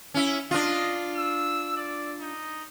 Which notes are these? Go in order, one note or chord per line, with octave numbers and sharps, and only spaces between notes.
C#4 E4
D4 F4 D#5
E6
D5
D#4